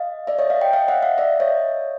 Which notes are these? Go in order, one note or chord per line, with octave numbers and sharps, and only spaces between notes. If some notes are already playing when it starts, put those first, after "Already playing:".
Already playing: D#5 F5
D5 E5
C#5 D#5
D#5 F5
F5 G5
D#5 F5
E5 F#5
D#5 F5
D5 E5
C#5 D#5